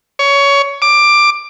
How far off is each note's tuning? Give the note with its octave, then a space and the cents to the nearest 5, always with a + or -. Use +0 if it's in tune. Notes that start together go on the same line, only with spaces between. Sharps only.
C#5 +20
D6 +15